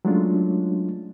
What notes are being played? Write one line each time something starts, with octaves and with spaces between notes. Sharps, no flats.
F#3 G#3 A3 C#4 D4 F4